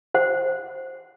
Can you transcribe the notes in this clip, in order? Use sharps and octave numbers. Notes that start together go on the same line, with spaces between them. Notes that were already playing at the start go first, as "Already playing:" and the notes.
C5 F#5